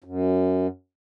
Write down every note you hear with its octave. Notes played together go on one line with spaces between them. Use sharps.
F#2